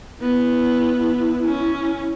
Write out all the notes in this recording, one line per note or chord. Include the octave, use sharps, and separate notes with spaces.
B3 E4
C#4